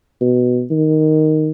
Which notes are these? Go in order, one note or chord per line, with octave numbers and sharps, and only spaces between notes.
B2
D#3